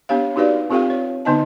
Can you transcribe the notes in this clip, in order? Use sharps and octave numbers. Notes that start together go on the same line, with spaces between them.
A#3 B3 D4 G4 C#5 F5
D#4 F#4 G4 B4 D5 F5
C4 F4 G4 A4 F5 G5
C#5
D3 B3 D#4 D#5 A5